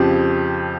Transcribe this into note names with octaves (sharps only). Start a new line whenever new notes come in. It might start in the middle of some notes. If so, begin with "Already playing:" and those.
Already playing: F2 C#3 F3 G4